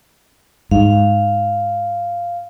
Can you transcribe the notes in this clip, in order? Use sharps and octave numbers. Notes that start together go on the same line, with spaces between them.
G#2 F5